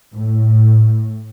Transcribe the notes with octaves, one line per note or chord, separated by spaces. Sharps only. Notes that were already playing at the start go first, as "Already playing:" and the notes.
A2